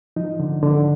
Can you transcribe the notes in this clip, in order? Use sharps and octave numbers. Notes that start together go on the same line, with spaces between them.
F3 D#4
D3
D3